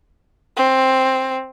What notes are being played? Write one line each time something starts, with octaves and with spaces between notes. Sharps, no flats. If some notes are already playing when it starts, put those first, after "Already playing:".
C4